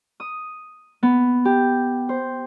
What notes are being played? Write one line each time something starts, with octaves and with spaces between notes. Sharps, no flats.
D#6
B3
G4
C5